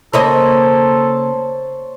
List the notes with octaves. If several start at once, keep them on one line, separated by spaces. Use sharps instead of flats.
C#3 A#3 A4 C5 C#5 D#5